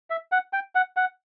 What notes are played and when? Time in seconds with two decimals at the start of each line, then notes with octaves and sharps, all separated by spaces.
0.10 E5
0.32 F#5
0.53 G5
0.75 F#5
0.97 F#5